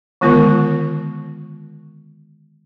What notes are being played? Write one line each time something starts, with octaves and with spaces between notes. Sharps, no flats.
D3 D#3 G#3 B3 F4 A#4